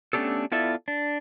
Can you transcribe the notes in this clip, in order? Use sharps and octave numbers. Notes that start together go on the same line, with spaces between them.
A3 B3 C#4 D4 G4 A4
B3 E4 F4 A4 D5 E5
D4